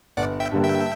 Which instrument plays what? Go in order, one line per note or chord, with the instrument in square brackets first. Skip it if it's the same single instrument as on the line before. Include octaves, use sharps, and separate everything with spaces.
[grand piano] G1 [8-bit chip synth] D5 F#5
[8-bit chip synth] E5 G5
[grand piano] G2 D3 G3 A#3
[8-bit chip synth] E5 G5